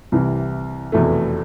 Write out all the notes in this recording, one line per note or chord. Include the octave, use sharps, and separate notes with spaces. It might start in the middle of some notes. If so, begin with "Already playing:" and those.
C2 C3 E3
F1 E2 B2 A3